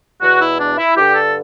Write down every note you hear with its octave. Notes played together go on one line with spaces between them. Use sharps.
E2 B2 F#4
E4
D4
E4
G2 D3 G4
A4